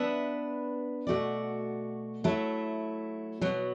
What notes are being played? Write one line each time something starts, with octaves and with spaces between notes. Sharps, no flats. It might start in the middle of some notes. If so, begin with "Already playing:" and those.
Already playing: B3 D4 B4 E5
B2 A3 F#4 D5
F#3 A3 E4
B2 F#3 B3